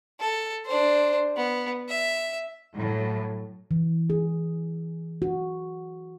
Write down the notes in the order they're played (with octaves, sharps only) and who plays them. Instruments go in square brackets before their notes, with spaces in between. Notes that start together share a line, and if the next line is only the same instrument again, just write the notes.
[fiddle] A4
D4 C5
B3
E5
[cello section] A2 F#3
[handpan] E3
G#4
F#4